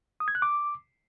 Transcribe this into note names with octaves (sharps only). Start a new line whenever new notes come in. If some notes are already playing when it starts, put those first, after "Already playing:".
D#6
G#6
F#6
D6